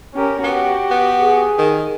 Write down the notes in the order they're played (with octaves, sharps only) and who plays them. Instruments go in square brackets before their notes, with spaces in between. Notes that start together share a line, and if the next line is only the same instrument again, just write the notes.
[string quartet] C#4 G4 A#4
[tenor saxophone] B3 [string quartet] F#4 G4
[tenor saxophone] B3
[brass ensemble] G#4
[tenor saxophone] D#3